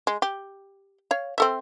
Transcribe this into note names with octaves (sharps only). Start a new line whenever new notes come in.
G#3
G4
C#5 F5
C4 A4 E5